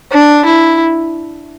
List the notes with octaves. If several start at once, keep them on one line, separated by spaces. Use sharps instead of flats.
D4
E4